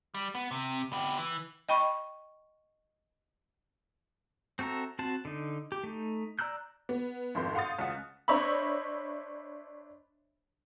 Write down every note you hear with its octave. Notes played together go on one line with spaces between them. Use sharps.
G3
B3
C3
B3 G4
E3
D#5 G5 B5 C#6
C4 F#4 A4 E5 A#5
C4 F#4 C5 A5
D3 D#4
G4
A3 D#4
D5 A#5 E6 F#6 G6
B3
G#1 F2 C6 G6
F5 F#5 C6 D#6 A6
C#2 F#5
D4 C5 C#5 D#5 E5 B5